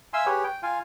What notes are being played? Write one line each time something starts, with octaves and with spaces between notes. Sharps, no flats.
E5 F5 G#5 C6 E6
G4 G#4 B4 C#5
G5
F4 F5 G#5